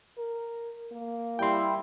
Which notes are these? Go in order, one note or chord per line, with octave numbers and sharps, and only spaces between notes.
A#4
A#3
G3 E4 G5 C6